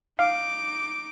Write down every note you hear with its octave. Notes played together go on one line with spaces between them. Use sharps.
D#4 F5 D6